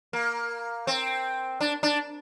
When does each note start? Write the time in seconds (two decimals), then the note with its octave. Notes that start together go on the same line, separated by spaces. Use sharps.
0.13 A#3
0.87 C4
1.61 D4
1.83 D4